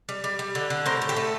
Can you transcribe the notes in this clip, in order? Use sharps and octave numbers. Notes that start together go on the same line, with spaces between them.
G3
G3
G3
D3
D3
A2 A#4 C5
A2
G4 A4
A3